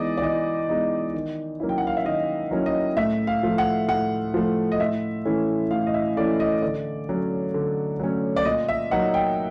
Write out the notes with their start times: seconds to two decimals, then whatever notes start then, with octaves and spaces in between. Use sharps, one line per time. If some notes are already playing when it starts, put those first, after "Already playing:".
Already playing: E3 G#3 B3 D#4 D5 D#5
0.17 D5
0.22 E3 D#5
0.69 G#3 B3 D#4
1.14 D#3
1.60 F#3 A#3 C#4 E4
1.69 G5
1.78 F#5
1.87 F5
1.97 E5
2.05 D#3 D#5
2.51 F#3 A#3 C#4 E4
2.66 D#5
2.97 A2 E5
3.27 F5
3.43 F3 A3
3.58 F#5
3.88 A2 F#5
4.34 F3 A3
4.72 D#5
4.80 A2 E5
5.25 E3 A3 C#4 E4
5.71 A2 F5
5.87 D#5
5.94 E5
6.17 E3 A3 C#4 E4 D5
6.40 D#5
6.62 D3 D5
7.09 F#3 A3 C#4
7.54 D3
7.99 F#3 A3 C#4
8.36 D5
8.45 A#2 D#5
8.69 E5
8.91 F#3 A#3 D#4 F#5
9.14 G5